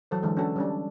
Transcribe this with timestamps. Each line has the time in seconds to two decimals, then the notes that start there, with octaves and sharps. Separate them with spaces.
0.11 E3 F#3 A4 C5
0.22 D3 E3 G#3 A4
0.37 C#4 D4 F#4 A4
0.56 G3 C#4 D4